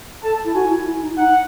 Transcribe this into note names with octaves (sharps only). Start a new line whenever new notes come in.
A4 A5
E4
F#4 G#5
E4
E4
D#4
D#4 F#5